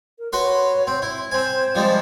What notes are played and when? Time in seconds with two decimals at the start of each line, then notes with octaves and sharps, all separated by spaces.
0.19 A#4
0.33 F#4 B4 C#5 C6
0.87 C4
1.02 E4
1.31 C4 C5 G#5
1.75 F3 G3 G#3